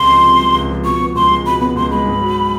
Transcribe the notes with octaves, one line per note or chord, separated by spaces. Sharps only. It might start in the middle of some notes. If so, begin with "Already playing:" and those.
Already playing: C#2 C3 G#3 C6
F3
C3
G#3
C#2
F3
B2 C#6
B3
C#2 C6
G#3
B2 B5
B3 B5
C#2 C6
G#3 B5
G#2
F#3